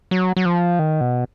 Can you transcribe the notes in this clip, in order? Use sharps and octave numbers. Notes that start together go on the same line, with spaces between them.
F#3
F#3
F3
D#3
B2